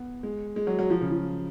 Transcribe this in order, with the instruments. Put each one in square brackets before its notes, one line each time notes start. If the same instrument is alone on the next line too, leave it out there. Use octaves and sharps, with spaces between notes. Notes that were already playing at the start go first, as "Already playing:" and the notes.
Already playing: [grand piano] B3
G#3
G#3
F#3
F#3
F3
C#3
F3